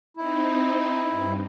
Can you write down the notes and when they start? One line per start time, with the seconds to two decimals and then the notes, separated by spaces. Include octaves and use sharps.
0.17 C4 D#4 E4
1.09 G2